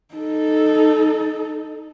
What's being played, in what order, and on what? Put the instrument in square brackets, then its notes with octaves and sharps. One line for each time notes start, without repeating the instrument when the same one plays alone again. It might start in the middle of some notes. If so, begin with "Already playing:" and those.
[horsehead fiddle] D#4 A4